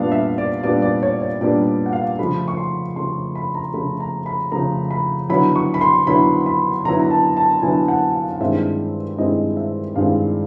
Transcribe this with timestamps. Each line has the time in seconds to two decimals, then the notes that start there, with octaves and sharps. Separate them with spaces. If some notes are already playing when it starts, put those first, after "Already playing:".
Already playing: A#2 G3 B3 D4 F5
0.12 E5
0.38 D5
0.63 A#2 G3 B3 D4 D5
0.82 D5
1.03 C#5
1.22 C#5
1.41 A#2 G3 B3 D4 D5
1.86 F#5
1.93 F5
2.19 C#3 F3 A3 B5
2.48 C#6
2.57 C6
2.96 C#3 F3 A3 C6
3.35 B5
3.55 A#5
3.74 C#3 F3 A3 B5
4.00 A#5
4.26 B5
4.52 C#3 F3 A3 A#5
4.91 B5
5.29 D3 F#3 B3 E4 B5
5.56 C#6
5.74 B5
5.81 C6
6.07 D3 F#3 B3 E4 B5
6.46 B5
6.85 D3 F#3 B3 E4 A#5
7.00 A#5
7.11 A5
7.37 A5
7.62 D3 F#3 B3 E4 G#5
7.88 F#5
8.14 F5
8.32 F5
8.40 G2 D#3 G#3 C4 E4 E5
9.18 G2 D#3 G#3 C4 E4 D#5
9.57 E5
9.96 G2 D#3 G#3 C4 E4 F5